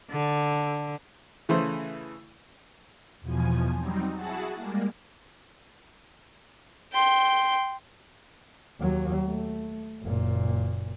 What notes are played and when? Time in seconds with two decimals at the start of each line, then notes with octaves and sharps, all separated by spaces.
0.11 D3
1.49 C#3 E3 A3 C5
3.21 E2 B2 F3 G#5
3.76 F#3 G3 C4 D#4
4.13 E4 F#4 G#4 F#5 A5
4.55 G3 G#3 A#3
6.93 G5 C6
8.80 D#2 F#3
9.27 A3
10.02 F#1 A#2